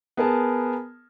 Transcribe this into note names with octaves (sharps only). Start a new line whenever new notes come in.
B3 G#4 A#4 A5